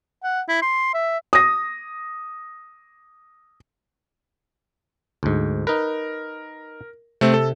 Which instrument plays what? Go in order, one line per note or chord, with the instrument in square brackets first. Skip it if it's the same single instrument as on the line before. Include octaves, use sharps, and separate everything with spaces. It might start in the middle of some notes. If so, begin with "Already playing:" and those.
[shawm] F#5
E4
C6
E5
[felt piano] D#6 A#6
[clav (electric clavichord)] D2 G#2
[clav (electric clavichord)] D#4 B4 [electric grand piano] A#4
[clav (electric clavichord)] C3 [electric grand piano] A3 C4
[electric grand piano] A4